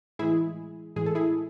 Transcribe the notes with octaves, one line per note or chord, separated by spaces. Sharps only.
A2 E3 G#3 E4 G#4
A2 E3 G#3 G#4
A4
E4 G#4